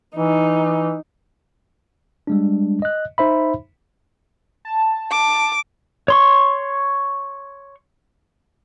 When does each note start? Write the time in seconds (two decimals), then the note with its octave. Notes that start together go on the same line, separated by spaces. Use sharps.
0.16 E3 D#4
2.27 G3 G#3 D4
2.82 D#5 F#6
3.18 D#4 C5 E5 B5
4.65 A5
5.11 D6
6.08 C#5 C6 C#6